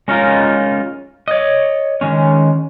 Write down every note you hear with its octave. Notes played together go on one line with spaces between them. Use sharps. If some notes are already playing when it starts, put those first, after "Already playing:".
G#3 C#4 D#4 F4 A#4
C#5 D#5
D#3 G#3 C#4